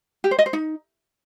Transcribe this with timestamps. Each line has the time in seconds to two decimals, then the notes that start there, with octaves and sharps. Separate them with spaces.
0.24 G4
0.31 C5
0.39 D#5
0.46 C5
0.53 D#4